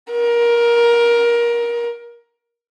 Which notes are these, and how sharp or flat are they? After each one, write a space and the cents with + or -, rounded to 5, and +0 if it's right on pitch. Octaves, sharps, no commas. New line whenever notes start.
A#4 +20